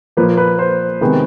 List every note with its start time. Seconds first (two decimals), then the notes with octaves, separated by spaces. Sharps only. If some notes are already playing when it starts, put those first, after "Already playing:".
0.17 A#2 F3 A#3 B4
0.37 B4
0.59 C5
1.01 C3 D#3 G#3 B3